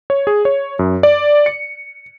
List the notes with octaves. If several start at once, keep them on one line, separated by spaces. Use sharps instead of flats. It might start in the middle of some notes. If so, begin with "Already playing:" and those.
C#5
G#4
C#5
F#2
D5
C#7